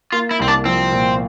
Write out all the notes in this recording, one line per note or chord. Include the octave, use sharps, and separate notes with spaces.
A#3 F4
E4
C2 C4
D4
F3 C4
A#2